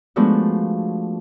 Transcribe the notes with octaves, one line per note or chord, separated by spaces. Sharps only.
F3 G#3 A3 B3 D4 F#4